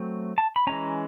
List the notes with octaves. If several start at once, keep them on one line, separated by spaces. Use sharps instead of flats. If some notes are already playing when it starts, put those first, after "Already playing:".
Already playing: F#3 A3 C4
A5
B5
E3 G#3 C#4 A#5